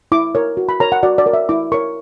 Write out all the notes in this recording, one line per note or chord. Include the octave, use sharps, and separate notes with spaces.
E4 D6
A#4 C#5
F#4
B5
A#4 C#5 A#5
F#5
F#4 D5
D5
A#4 C#5
E5
E4 D6
A#4 C#5 C#6